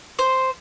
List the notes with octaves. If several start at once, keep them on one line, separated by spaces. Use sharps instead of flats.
C5